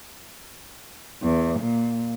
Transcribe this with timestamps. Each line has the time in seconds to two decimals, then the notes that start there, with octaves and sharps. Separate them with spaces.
1.22 E2
1.59 A#2